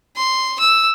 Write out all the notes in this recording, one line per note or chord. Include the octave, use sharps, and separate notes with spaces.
C6
E6